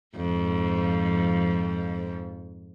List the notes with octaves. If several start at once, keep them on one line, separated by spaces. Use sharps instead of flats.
F2 G#2 F3